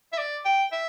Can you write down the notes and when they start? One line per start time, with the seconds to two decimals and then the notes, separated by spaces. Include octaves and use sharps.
0.13 E5
0.18 D5
0.45 G5
0.72 E5